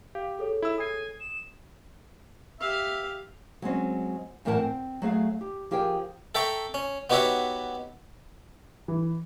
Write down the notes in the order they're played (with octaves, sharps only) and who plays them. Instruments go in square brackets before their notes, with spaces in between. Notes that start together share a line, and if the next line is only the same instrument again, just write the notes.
[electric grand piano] G4 [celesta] F5
[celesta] G#4 A4 C#5
[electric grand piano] E4 E6
[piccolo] G#5 [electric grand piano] D#6 C7
[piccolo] E7
[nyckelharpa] G4 F5 [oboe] E5
[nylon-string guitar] F#3 G#3 C4 C#4
F#2 A2 E3 A#4 F#5 A5
C4
F#3 A3 G#4 F5
G4
F3 G4 G#4 A#4 G5
[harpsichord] A4 E5 G5 A#5 C#6
C#4
B3 D#4 F#4 G4 C#5 E5
[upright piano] E3